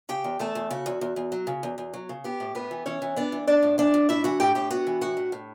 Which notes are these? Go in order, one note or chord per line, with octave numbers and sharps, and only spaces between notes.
C#3 G4 G5
E2
E2 A3 A4
E2
C#3 F#4
E2
E2
E2
F#3
C#3
E2
E2
F#3
C#3
B3 G4
A2
A2 B3 B4
E3
E3 C#4 C#5
E3
B3 D4 D5
E3
A2 D4 D5
A2
E3 D4 D5
A2
A2 E4 E5
E3 F#4 F#5
A2 G4 G5
A2 G4 G5
B3 F#4 F#5
E3
A2 F#4 F#5
A2
A2